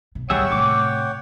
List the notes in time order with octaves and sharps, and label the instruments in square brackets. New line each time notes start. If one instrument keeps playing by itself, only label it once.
[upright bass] B2
[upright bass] D2 A2 [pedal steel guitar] G3 G#4 E5 [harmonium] C#5 F#5 G5
[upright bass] A2 C3 [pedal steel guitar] D6